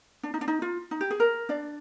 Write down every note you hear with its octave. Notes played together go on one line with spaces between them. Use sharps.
D4
D#4
D4
D#4
F4
D#4
G4
G#4
A#4
D4 D5